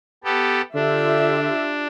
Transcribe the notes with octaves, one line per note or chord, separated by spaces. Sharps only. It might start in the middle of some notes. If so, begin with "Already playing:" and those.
B3 G4 A4
D3 D4 F4 G4 E5